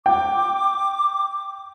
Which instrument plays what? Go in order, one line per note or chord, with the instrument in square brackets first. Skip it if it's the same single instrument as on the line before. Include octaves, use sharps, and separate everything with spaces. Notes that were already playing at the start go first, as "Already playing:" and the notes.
[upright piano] G5 [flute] D6